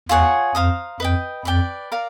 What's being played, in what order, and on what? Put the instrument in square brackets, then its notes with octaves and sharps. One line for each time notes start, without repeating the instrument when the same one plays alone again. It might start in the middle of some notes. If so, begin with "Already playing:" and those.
[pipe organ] E2 [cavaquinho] F4 G#4 C#5 F#5
[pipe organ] F2 [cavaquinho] C5 F5 A#5 D#6
[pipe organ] F2 [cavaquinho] B4 D#5 G5
[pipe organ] F2 [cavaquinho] B4 D5 G5
[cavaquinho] A#4 D5 F5 A#5